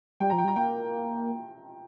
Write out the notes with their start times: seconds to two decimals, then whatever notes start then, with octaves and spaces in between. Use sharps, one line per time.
0.20 G3 G5
0.30 F3 A#5
0.38 G5
0.44 G3 A#5
0.56 A#3 G5